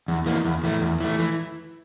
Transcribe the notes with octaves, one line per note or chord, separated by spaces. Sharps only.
E2
E3 A#3
E2
E3 A3
E2
E3 A3
E3